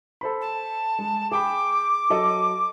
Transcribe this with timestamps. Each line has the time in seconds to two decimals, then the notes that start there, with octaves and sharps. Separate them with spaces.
0.21 A4 C5 B5
0.41 A5
0.99 G#3
1.31 G#4 G5 B5 D6
2.10 F#3 A4 D#5